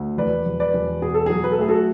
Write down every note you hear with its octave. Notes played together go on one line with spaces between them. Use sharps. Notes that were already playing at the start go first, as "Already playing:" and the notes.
Already playing: D2
E1 B4 D5
E1
B4 D5
E1
B2 G#4
A4
F#3 G#4
B4
A4
A3 G#4
F#4 A4